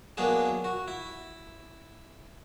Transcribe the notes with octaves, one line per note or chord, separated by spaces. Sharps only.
F#3 A#3 B3 D4 G#4
F#4
E4